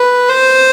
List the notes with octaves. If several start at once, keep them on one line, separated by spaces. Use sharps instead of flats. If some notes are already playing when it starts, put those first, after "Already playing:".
Already playing: B4
C5